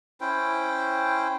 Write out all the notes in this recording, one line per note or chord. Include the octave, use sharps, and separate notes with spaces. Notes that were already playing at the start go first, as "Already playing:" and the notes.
C#4 E4 C5 G5